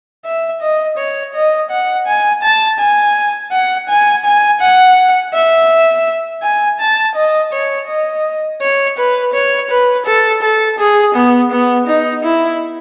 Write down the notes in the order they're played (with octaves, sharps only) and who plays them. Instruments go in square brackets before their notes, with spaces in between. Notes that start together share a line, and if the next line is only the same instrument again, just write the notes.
[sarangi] E5
D#5
C#5
D#5
F#5
G#5
A5
G#5
F#5
G#5
G#5
F#5
E5
G#5
A5
D#5
C#5
D#5
C#5
B4
C#5
B4
A4
A4
G#4
B3
B3
D#4
E4